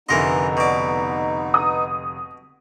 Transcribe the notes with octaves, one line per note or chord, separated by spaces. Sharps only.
F1 D3 E3 B3 D#4 A#4 D#5 C6
B2 D5
D#6